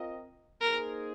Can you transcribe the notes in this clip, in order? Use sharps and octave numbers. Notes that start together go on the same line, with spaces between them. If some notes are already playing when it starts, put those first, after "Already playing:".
Already playing: C4 F4 A#4 D#5
A#3 D#4 G#4 A#4 C5